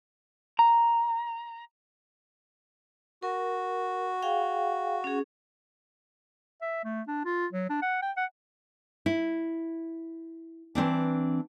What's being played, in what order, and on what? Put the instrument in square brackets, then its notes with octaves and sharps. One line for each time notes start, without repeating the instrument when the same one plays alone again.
[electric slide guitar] A#5
[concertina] F#4 [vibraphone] A#4
[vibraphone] G#4 F5 G5
C#4 G#4
[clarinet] E5
A3
D4
F4
F#3
D4
F#5
G5
F#5
[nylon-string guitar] E4
E3 A#3 C4 D4